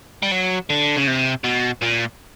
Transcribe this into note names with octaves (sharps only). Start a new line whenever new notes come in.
G3
F#3
D3
C#3
C3
B2
A#2